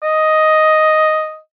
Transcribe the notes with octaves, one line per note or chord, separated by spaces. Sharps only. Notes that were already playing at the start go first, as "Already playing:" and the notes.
D#5